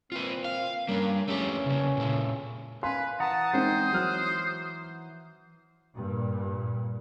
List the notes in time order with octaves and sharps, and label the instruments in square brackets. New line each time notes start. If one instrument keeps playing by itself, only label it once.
[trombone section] A#2 A#3 C4 [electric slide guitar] F4 B4
[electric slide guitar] F5
[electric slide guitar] G3 D4 [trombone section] A#3 C#4
[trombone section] E2 C#4 [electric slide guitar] A3 G4
[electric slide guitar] C#3 A#3
A#2 A4
[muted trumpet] B4 [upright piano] F5 G#5 C6
[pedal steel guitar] E3 F#5 A#5 [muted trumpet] A5 [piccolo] D#6
[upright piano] G#3 C4 D#4 [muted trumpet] C5
[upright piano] F#3 F6 F#6
[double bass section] G2 A#2